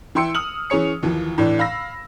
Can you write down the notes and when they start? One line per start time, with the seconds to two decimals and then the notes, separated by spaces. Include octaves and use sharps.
0.15 E3 E4 G5 C6 E6 C#7
0.35 D#6 F6 F#7
0.70 E3 C#4 G#4 C#5 C#7
1.03 D#2 E3 F3
1.38 A2 E3 D4
1.59 F5 B5 E6 A#6